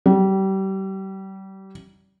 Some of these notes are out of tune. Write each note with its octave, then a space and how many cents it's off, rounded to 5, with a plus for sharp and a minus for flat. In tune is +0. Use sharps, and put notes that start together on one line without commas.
G3 -30